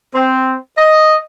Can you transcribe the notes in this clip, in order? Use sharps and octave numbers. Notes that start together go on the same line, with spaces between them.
C4
D#5